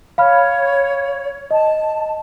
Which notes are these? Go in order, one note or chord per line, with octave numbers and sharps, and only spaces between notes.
C#5 F5 B5 F6
D#5 A5